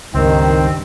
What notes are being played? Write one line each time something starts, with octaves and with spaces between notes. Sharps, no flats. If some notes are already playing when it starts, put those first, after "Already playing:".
C#2 G2 D#3 C4